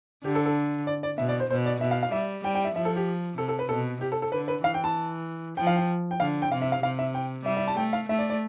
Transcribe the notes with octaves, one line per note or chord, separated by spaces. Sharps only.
D3 G4
A4
A4
D5
D5
B2 E5
D5
C5
B2 C5
D5
B2 E5
F5
F5
G3 E5
G3 G5
G5
E5
F3 E5
A4
G4
C3 A4
A4
B4
B2 A4
C3 G4
A4
A4
D3 B4
B4
E3 F5
G5
A5
F3 G5
F5
G5
G5
D3 F5
G5
C3 F5
E5
F5
C3 F5
E5
G5
G3 E5
E5
A5
A3 G5
F5
A3 E5
D5
D5